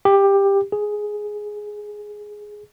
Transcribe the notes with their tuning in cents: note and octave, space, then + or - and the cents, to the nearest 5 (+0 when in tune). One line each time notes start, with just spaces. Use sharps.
G4 +15
G#4 +5